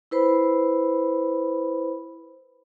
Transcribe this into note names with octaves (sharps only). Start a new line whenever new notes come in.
E4 B4 C5 B5